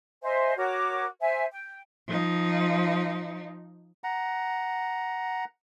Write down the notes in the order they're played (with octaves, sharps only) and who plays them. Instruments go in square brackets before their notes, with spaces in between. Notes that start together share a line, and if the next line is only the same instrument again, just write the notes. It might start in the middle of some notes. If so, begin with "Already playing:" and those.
[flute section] C5 D#5 E5 G#5
F#4 A#4 C#5 D6
C5 E5 G#5
G5
[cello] F3 D#4
[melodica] F#5 A#5